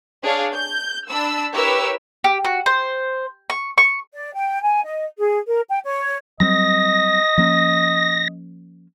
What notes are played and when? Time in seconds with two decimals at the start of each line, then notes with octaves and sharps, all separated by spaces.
0.23 D4 G#4 C#5 F5
0.54 G6
1.10 D4 A5 B5 E6
1.55 E4 G4 A#4 B4 C#5 E6
2.24 G4
2.45 F#4
2.66 C5
3.50 C#6
3.78 C#6
4.13 D5
4.34 G5
4.63 G#5
4.84 D#5
5.18 G#4
5.47 A#4
5.69 G5
5.84 C#5
6.40 F#3 G3 C4 D#5 A#6
7.38 F3 A#3 C#4